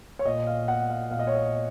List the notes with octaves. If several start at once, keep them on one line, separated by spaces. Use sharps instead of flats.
C#5
A#2 D#5
F5
F#5
F5
A#2 F5
D#5
C#5
D#5